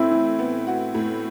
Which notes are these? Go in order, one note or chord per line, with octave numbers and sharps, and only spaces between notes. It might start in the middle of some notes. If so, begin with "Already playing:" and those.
Already playing: A2 C4 E4
E3
B3
F#4
A2